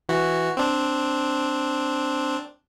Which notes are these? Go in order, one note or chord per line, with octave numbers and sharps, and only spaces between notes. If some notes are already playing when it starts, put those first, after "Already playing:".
E3 F#4
C4 D4